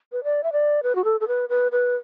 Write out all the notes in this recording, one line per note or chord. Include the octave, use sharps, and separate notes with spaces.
B4
D5
E5
D5
B4
F#4
A4
A4
B4
B4
B4